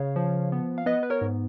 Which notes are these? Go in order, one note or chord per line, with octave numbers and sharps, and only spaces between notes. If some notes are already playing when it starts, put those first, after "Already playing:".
Already playing: C#3 C#5 F5
F3
B3
F5
B3 B4 D#5
B4
A#4 C#5
G#2